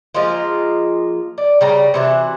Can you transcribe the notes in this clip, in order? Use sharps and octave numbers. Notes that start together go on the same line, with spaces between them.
F3 G#3 A#3 F4
D5
C#3 G3 A#5
C3 E3 F#4